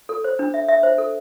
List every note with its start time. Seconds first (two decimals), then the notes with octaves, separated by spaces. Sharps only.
0.09 A4
0.24 C5
0.39 D4
0.54 E5
0.69 E5
0.83 C5
0.98 A4